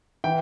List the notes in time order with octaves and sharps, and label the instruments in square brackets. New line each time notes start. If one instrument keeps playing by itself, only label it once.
[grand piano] E3 G5